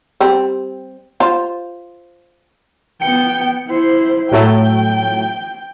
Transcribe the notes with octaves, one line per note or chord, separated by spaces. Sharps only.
G3 C4
F4 C5
B3 G5 C#7
E4 C5
A2 F#3 A3 G5